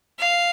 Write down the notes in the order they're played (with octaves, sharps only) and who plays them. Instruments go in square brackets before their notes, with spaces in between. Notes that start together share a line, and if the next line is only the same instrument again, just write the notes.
[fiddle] F5